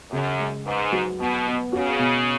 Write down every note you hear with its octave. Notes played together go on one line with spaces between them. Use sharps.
F#2 C#3
G#3
G#2 B4
F#3
B2 B3
B3
C#3 F#4
B2